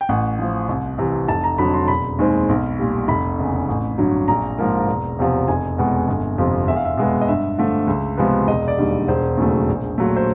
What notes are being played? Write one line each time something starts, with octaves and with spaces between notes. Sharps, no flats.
G5
A1 F#5
A2 F3
C2
C3 E3
F1 A5
A#5
F2 D3 F#3 B5
C6
E1 B5
D#2 D#3 G#3 C4
B1
A#2 G3
F1 B5
E2 C#3
A1
G2 D3 F#3
A#1 A#5
G#2 F3 A#3
E1
E2 C3 F3
F1 G#5
E2 B2 G#3 B3
G1
F2 C3 F3
E2 E5
F5
E5
B2 G#3 B3 F5
D#5
G2 E5
D3 F3 A3
C#2
C3 F3 G#3 B3
E1 D#5
D5
D#2 D3 G3
E1 C5
D#2 C#3 F#3 A3
A#1
A#2 F#3 A3
C5